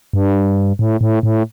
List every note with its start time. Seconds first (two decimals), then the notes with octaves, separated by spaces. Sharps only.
0.13 G2
0.79 A2
1.01 A2
1.23 A2